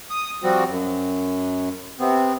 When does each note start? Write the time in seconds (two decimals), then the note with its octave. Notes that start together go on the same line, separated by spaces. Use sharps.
0.10 D#6
0.43 F3 G3 C4 F#4
0.68 F#2
2.00 C3 B3 C4